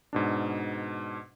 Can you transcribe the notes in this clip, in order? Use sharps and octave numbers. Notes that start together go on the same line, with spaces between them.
G#2 B2 D4